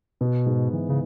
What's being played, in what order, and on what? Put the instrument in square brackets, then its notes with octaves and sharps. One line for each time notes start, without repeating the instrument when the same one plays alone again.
[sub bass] B2 [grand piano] B3
[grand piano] G#2
E3
[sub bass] C#3